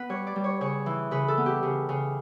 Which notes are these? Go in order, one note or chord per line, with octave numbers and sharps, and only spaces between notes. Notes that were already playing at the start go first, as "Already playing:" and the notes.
Already playing: B3 B4
G3 C#5
D5
G3
C#5
C#3 C#5
E3
C#3 B4
A4
B3
G4
C#3
C#3